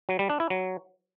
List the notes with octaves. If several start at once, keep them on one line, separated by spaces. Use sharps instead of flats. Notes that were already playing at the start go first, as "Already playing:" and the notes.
F#3
G3
D4
E4
F#3